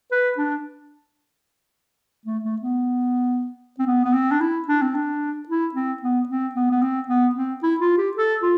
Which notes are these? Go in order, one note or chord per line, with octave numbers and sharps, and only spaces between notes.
B4
D4
A3
A3
B3
C4
B3
B3
C4
D4
E4
D4
C4
D4
E4
C4
B3
C4
B3
B3
C4
B3
C4
E4
F4
G4
A4
F4